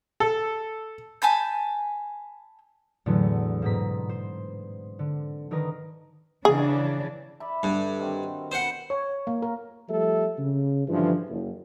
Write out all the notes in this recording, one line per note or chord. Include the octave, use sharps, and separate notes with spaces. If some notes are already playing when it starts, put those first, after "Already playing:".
A4
G#5 A5 B5 G6
E2 A2 D3 F#3 A3
G#2 B2 C4 A#5 D#6 B6
C5
D3
D3 D#3 A#4 B4 D#6 A#6
C#3 E3 D4 G#4
D5 E5 B5
G2 D3
D#3 C4 F#4
B3 C5 F#5
C#5
A#3
A#4
F3 G3 A3 G4 A4 E5
C#3
G2 D3 E3 F3
F#1